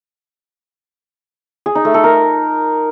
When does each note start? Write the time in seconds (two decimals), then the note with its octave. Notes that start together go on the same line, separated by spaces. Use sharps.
1.66 G#4
1.75 D#4
1.85 A3
1.94 A4
2.04 A#4